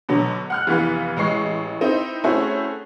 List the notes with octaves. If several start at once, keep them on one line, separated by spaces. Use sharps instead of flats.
B2 D3 F#3
F#5 F6 F#6
F1 E3 B3 F5
A1 G#3 D#5 C#6 C7
C4 D#4 E4
A3 C4 C#4 E4 F#4 G#4